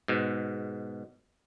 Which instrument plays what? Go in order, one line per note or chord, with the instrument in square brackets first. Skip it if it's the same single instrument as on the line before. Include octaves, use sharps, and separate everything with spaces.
[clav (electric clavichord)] G#2 B2